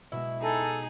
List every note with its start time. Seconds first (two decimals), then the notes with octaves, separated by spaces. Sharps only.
0.12 B2 G#3 E4
0.41 D#4 G#4 A4